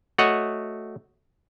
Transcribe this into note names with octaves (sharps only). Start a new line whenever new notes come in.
A3 F#4 C#5 D#5 F#5